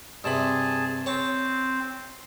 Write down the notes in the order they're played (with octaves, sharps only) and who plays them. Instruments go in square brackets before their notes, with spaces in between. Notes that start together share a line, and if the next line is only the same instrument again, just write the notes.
[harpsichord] G2 C3 B5 [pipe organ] G#4 A5
[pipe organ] C4 [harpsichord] C#5 A5